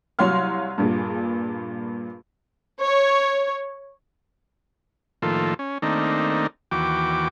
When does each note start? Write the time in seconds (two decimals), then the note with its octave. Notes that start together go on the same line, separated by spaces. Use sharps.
0.19 C2 F#3 C#5 F5 C6 F6
0.78 G2 A#2 G#4
2.83 C#5
5.22 A2 D#3 F3 A#3 F4 A4
5.59 C#4
5.82 D#3 A3 A#3 C4 D4 D#4
6.71 D#2 E3 F#4 G5 D6